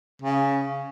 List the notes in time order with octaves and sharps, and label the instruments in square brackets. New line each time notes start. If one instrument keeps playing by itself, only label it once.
[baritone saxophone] C#3